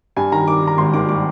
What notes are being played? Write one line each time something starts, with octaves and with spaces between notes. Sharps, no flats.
G2 G#5
D#3 A#5
D#3 D6
D#3
A#5
G#1 C6
D#3 D6
G3 D6